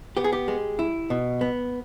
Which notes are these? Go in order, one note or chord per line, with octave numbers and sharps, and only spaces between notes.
B3 G4
G#4
G4
G#3
E4
B2
B3